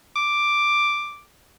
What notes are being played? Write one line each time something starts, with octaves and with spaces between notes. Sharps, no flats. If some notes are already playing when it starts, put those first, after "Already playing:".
D6